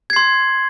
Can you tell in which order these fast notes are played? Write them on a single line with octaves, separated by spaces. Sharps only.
G#6 C7 C6